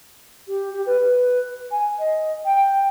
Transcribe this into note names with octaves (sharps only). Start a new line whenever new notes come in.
G4
G4
B4
G#5
D#5
G5